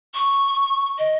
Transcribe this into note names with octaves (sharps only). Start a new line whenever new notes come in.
C#6
D#5